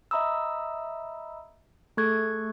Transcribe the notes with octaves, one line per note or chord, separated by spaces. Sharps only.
D#5 E5 A#5 B5 D#6 E6
A3 G#4 A4 C#6 F#6 G#6